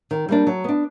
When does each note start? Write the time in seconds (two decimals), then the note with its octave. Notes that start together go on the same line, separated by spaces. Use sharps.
0.11 D#3
0.29 G3 A#3 D4
0.47 F#3
0.64 B3 D4